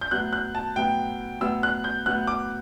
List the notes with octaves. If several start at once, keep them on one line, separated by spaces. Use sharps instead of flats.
G6
A2 F#3 B3 F#6
F#6
A5
A2 F#3 B3 G5
A2 F#3 B3 E6
F#6
G6
A2 F#3 B3 F#6
D6